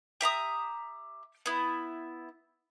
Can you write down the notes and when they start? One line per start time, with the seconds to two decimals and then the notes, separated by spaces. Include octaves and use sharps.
0.21 G4 E5 A#5 D#6
1.46 B3 E4